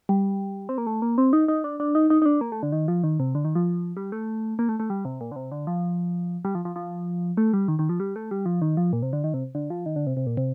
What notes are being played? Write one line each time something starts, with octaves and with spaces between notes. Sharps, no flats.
G3
C4
A#3
A3
A#3
C4
D#4
D#4
D4
D4
D#4
D#4
D#4
D4
A#3
A3
D3
D#3
F3
D#3
C3
D3
D#3
F3
G3
A3
A#3
A3
A3
G3
C3
A#2
D3
C3
D3
F3
G3
F3
F3
F3
A3
G3
D#3
D#3
F3
G3
A3
G3
F3
D#3
F3
A#2
C3
D3
D#3
C3
D3
F3
D#3
D3
C3
C3
A#2
C3